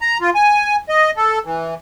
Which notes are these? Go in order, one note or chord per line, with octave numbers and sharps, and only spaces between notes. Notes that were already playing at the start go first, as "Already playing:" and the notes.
A#5
F4
G#5
D#5
A4
E3